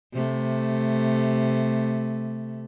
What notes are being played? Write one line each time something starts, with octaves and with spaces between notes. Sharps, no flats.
C3 A3